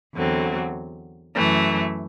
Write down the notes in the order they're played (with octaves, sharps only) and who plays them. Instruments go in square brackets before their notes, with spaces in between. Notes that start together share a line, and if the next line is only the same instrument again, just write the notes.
[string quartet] E2 D3 F#3 C4
F#2 E3 A3